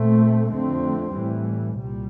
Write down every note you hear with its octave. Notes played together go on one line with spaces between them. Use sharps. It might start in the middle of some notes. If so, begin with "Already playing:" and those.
Already playing: A#2 A3 C4
F2 D3 A3 C4
A2 E3 G3
C2 A#2 G3